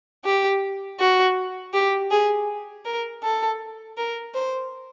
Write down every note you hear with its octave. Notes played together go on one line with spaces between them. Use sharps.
G4
F#4
G4
G#4
A#4
A4
A#4
C5